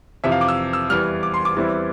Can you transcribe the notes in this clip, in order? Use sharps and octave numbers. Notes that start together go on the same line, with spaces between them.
F2 C3 E3 E5
F5
D6
E6
E6
E2 E3 G3 F6
D6
C6
D6
E2 E3 G3 C4 E4